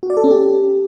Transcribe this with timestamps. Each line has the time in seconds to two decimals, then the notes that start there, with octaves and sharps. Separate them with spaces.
0.03 F#4
0.10 D5
0.17 A4
0.24 C#4
0.31 G4